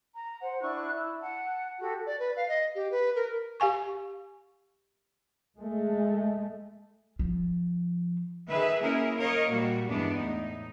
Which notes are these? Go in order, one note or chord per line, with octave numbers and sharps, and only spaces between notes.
A#5
C5 F#5
D4 E4 C#6 F#6
E4
F#5 A5
F#4 G4 A4
D5
B4
F5
D#5
G4
B4
A#4
G4 F5 G#5 C#6
G#3 A3
F3
D#3 G#4 B4 E5
A#3 C#4 E4 G#4 A#4
A#4 C#5 D#5 F5
A#2 G3 A#3 F#4
E2 G2 G#3 B3 D4
A2 D#4